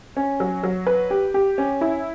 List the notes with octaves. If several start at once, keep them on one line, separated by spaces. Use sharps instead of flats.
C#4
F#3
F#3
B4
G4
G4
C#4
E4